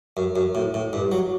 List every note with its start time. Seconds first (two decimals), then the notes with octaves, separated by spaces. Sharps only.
0.17 F#2
0.36 F#2
0.55 A2
0.74 A2
0.93 G2
1.12 F#3